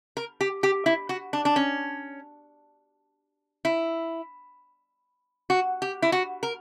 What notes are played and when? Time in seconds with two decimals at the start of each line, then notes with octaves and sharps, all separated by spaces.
0.17 A#4
0.41 G4
0.63 G4
0.86 E4
1.09 F#4
1.33 D4
1.45 D4
1.56 C#4
3.65 E4
5.50 F#4
5.82 G4
6.02 E4
6.12 F#4
6.43 A#4